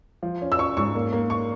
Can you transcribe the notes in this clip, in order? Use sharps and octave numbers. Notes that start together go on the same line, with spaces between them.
F3
C#4
E6
C#4 C#6
G#2 C#6
A#3
A#3
C#6